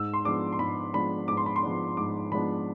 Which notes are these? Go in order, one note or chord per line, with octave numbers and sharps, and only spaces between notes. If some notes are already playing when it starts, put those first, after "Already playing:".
Already playing: G#2 E6
C6
F3 G#3 B3 D4 D6
C6
G#2 B5
F3 G#3 B3 D4 B5
G#2 D6
C6
B5
C6
F3 G#3 B3 D4
G#2 D6
F3 G#3 B3 D4 B5